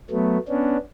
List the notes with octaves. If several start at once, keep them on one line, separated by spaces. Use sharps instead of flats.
F#3 A3 B3
B3 C#4 D4